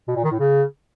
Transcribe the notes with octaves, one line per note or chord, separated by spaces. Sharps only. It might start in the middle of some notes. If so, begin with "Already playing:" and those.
B2
A#2
D#3
A2
C#3